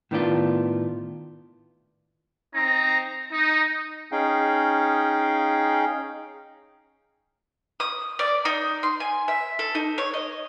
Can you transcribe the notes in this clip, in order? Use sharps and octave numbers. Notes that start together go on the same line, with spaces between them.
A2 D#3 B3 D4 F4
C4 D#4 A#5
D#4
C#4 D#4 G#4 F5 G5
D#6
D5
D#4
C6
G#5
E5
A4
D#4
C#5
D#5